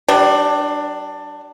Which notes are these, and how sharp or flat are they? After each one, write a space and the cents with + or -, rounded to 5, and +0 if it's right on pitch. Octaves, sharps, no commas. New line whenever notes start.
G3 -35 D4 +15